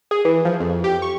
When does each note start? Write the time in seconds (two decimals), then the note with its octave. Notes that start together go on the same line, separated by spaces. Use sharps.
0.11 G#4
0.25 E3
0.45 F3
0.60 F2
0.84 G4
1.02 C#6